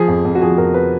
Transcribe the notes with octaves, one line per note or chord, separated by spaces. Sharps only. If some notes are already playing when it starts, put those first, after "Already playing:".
Already playing: F3 G#4
F2
F2
F#4
F3 G#4
F2 A#4
B4